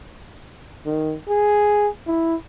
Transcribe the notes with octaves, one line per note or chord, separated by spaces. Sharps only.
D#3
G#4
E4